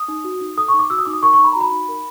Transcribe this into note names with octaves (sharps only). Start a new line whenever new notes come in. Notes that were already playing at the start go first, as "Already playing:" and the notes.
Already playing: D#6
D#4
F#4
D#4
A4 D#6
C#6
D#4
D6
F#4 E6
D#6
D#4 D6
D#6
A#4 C#6
C#6
D#4
B5
A#5
F#4 B5
D#4
A#4